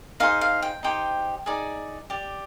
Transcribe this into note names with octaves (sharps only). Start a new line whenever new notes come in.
D#4 G#4 C5 F5
F5
G5
D#4 G4 C5 G5
D#4 G#4 D5
G4 D5